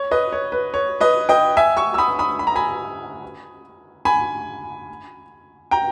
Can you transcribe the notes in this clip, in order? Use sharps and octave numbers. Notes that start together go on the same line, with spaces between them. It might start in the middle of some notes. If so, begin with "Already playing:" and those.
Already playing: C#5
B4 D#5
C#5
B4
C#5
B4 D#5
D#5 G5
E5 G#5
C#6 E6
E6
B5 D#6
B5 D#6
B5
A#5
G#5 B5
G#5 B5
G5 A#5